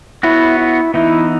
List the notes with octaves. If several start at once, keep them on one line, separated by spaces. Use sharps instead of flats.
B3 E4 F#4 C#5
E4
E3 B3 D#4 E4